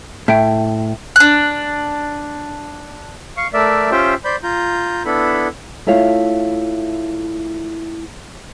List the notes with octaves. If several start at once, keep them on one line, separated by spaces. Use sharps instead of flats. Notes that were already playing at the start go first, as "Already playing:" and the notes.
A2 E5 G5
D4 F#6
F5 C#6
A3 A#4 D5 E5
C#4 F4 G4 C5 E5 G5
C5 D5 B5 G6
F4 A#5 G6
B3 D4 E4 A4 B5
A3 E4 F4 C#5 F5